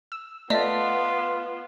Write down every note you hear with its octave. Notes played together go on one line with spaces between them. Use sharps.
E6
A3 B3 F4 D5 D#5 A5 B6